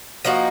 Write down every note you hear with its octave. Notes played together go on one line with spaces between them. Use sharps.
F3 A#3 D#4 F#4